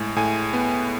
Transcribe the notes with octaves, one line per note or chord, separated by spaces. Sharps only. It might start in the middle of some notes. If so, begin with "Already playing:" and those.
Already playing: A2 G#3
A2 G#5
B3